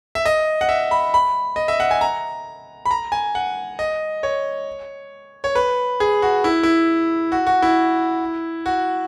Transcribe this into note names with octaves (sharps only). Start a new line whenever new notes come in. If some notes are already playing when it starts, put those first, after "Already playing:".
E5
D#5
F#5
E5
B5
B5
D#5
E5
F#5
G#5
A#5
B5
A#5
G#5
F#5
D#5
C#5
C#5
B4
G#4
F#4
E4
E4
F#4
F#4
E4
F#4